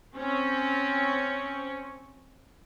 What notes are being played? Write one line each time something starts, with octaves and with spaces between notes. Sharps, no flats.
C4 C#4